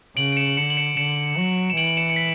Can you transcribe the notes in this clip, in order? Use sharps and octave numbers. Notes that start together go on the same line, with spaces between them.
C#3 D7 F#7
D7
C#7 E7
D3 C#7 E7
F#7
C#7 E7
D3 C#7 E7
F#3
E7
E3 D7 F#7
F#7
C#7 E7
C#7
B6